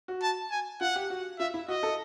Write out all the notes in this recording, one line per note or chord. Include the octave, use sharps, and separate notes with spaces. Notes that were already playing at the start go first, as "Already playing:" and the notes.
F#4
A5
G#5
F4 F#5
G4
F#4
F4 E5
E4
F#4 D#5
A4